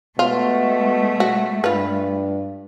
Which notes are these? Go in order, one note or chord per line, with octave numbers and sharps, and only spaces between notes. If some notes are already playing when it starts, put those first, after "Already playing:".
B2 G#3 A3 F4
F#4
G2 F4 B4